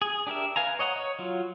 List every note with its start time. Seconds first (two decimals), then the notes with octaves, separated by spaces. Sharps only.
0.02 G#4
0.27 D4 G4 A#4 E5
0.56 B4 F5 G#5 A#5
0.79 C#5 D#5 F#5 A#5
0.96 C#5
1.19 F#3 F4